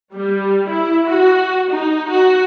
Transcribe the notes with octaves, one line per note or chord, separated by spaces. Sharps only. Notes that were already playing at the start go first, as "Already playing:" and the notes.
G3
E4
F#4
D#4
F#4